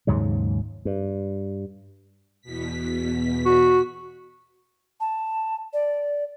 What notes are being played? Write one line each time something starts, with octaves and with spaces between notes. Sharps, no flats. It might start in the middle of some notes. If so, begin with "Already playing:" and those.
D#2 G#2 C#3 F#3
G2
E2 B2 B6
F#4
A5
D5